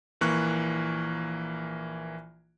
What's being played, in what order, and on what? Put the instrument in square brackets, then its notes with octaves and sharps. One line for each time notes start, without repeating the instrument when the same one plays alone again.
[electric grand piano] A#1 E3 A#3 C#6 F#6